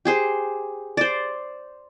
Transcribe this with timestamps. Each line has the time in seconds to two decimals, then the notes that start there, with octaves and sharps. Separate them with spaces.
0.05 G4 G#4 C5
0.97 C5 D5